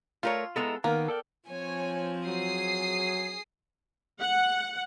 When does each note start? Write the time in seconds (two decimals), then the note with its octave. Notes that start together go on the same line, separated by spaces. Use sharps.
0.23 A3 F4 A#4 C#5
0.56 G#3 B3 E4 A4 D#5 A#5
0.84 D#3 A#3 B3 A#4
1.08 A4 D5 G5
1.49 F3 C4 C#5 G#5
2.27 F#3 G#4 D#6 C7
4.20 F#5